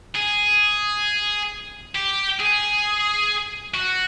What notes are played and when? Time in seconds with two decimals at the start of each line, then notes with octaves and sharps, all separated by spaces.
0.15 G#4
1.95 G4
2.39 G#4
3.75 F#4